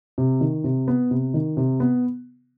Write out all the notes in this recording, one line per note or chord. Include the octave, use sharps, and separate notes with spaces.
C3
D#3
C3
B3
C3
D#3
C3
B3